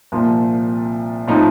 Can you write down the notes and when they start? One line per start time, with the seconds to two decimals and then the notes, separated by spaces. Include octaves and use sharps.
0.12 C2 A#2 F3
1.28 A2 F3 C4 D#4